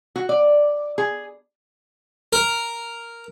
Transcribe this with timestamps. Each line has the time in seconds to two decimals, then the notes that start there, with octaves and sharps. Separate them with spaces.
0.16 F#4
0.29 D5
0.98 G#4
2.33 A#4